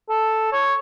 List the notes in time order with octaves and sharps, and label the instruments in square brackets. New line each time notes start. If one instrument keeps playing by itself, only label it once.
[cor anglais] A4
C#5